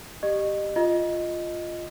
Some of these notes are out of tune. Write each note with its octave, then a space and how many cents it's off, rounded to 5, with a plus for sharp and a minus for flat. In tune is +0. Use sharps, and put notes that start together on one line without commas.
G4 +0 D#5 -30
F4 +0 D#5 +0